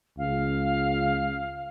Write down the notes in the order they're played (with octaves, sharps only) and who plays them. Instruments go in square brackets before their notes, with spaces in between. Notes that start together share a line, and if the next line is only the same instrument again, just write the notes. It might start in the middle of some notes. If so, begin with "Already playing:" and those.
[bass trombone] C#2 [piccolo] F5